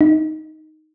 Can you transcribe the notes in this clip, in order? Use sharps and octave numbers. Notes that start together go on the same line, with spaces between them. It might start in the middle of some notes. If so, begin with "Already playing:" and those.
D#4